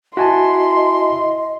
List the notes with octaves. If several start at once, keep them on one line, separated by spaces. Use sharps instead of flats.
E4 F#4 D#5 G#5 A5 C6